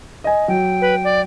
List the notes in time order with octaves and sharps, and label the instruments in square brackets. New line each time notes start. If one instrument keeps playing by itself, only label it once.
[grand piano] D#5 G#5
[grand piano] F#3 [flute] G5
[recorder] B4
D5